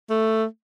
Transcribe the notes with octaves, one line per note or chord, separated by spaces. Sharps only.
A3